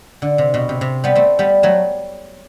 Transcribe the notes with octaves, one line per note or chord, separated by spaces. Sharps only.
D3
C3
B2
C3
C3
G3 B3
A3 C4
G3 B3
F#3 A3